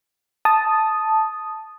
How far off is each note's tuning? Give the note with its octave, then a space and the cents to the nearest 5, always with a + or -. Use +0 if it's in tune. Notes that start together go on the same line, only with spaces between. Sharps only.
A5 -5 D#6 -5